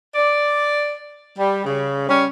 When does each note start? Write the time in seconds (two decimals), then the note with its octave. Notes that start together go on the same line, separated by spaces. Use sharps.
0.15 D5
1.39 G3
1.65 C#3
2.09 G3 C#4